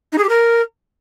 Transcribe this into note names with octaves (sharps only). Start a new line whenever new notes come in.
D#4
G#4
G4
A#4